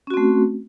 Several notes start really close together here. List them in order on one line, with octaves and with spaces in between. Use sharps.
C#4 F#4 C4 A3